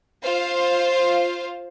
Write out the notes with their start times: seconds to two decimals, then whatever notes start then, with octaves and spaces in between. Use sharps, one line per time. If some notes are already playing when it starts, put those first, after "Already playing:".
0.24 F4 C5 F5